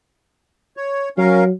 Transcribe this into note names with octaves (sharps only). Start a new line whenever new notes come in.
C#5
F#3 C#4 A#4 F5